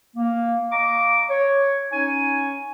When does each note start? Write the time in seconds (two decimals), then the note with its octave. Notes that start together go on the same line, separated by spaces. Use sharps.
0.16 A#3
0.70 D#5 F5 A#5 C#6 D6
1.30 C#5
1.92 C#4 D#4 C#5 G#5